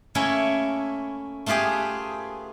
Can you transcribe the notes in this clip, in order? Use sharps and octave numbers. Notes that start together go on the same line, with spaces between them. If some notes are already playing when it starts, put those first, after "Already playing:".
A3 A#3 C#4 E4 C#5
A3 B3 F4 G4 G#4